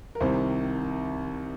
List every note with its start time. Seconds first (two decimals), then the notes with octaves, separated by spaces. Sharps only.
0.15 A#4
0.20 C2 C3 D#3 C5